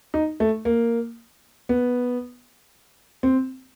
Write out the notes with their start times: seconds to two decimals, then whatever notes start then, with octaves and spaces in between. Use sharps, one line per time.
0.14 D#4
0.40 A3
0.65 A#3
1.69 B3
3.23 C4